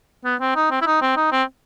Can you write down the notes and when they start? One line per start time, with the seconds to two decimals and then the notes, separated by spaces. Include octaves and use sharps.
0.24 B3
0.40 C4
0.56 D#4
0.71 C4
0.81 E4
0.86 D#4
1.02 C4
1.16 D#4
1.32 C4